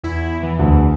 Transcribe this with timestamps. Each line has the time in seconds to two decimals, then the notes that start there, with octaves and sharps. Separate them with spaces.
0.03 E2 E4
0.40 E2 E3
0.59 D2